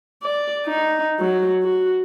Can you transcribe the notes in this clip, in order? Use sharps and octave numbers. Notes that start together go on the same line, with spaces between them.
D5
D#4
F#3
F#4